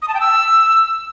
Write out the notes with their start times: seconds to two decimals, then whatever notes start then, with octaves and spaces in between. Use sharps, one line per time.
0.02 D#6
0.08 A5
0.14 G5
0.20 E6